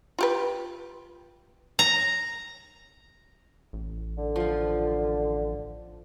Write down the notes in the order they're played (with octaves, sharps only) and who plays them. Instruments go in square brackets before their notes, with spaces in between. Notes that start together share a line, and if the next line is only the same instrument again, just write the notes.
[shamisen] F4 G4 B4
[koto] A#5
[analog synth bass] A1
[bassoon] D3
[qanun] F3 F4